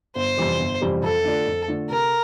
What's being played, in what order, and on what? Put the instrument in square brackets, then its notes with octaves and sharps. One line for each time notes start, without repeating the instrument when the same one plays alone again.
[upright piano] G1 [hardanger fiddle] C5
[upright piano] F2 C3 E3 G3
G1
F2 C3 E3 G3
[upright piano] F2 [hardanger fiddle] A4
[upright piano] D3 A3 D4 F4
F2
D3 A3 D4 F4
[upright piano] C3 [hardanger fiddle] A#4